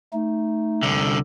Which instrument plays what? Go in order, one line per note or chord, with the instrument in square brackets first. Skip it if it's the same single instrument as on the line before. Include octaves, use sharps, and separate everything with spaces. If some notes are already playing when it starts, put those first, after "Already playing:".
[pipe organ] A3 D#4
[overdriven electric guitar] C2 D3